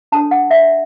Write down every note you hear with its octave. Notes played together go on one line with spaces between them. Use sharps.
D4 A4 C#5 A5
F#5
E5